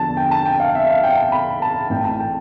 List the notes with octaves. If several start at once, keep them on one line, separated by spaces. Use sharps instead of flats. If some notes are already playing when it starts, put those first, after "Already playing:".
Already playing: E2 D3 F3 A5
G5
A5
G5
F5
E5
F5
G5
A5
B5
A5
A1 A2 E3 G5
A5
G5